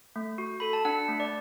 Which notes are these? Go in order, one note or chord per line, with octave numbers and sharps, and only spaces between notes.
A3
F#4
A4 B5
A5
D4 F#5
A3
D5